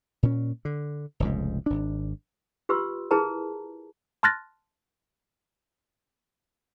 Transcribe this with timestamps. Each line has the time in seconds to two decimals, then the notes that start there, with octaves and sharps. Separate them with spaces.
0.23 A#2 C#4
0.65 D3
1.20 F1 C#2 G#2
1.66 G#1 D4
2.69 F4 G4 B4 C6 E6
3.11 E4 G#4 A#4 B4 A5 A#5
4.23 A5 C6 F6 F#6 A6 A#6